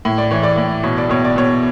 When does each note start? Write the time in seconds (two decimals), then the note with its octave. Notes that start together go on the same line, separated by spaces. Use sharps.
0.05 A2
0.18 D5
0.31 E3 C#5
0.43 D5
0.57 A2
0.83 B2 C#5
0.98 D5
1.09 B2 C#5
1.25 D5
1.36 B2 C#5